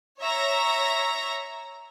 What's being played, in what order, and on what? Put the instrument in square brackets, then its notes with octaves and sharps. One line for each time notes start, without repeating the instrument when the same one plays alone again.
[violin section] C#5 E5 A#5 A#6